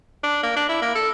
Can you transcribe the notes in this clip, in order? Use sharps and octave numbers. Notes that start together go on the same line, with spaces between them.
D4
A#3
D4
E4
A#3
A4